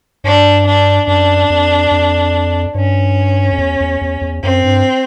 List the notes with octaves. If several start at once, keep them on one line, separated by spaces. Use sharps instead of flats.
G2 D4
D4
F#2 D4
F2
F2
G2 C#4
F2
E2
E2
E2
E2
F#2 C4
G2